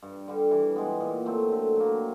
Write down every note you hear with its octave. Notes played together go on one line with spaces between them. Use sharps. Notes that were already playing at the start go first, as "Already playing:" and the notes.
G2
D3 G3
E3
G#3 B3
A#2
F#3 A3 C4
D3
F#3 A#3